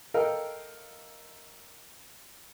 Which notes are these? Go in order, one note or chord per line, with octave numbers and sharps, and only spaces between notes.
A4 A#4 D#5 F5 G5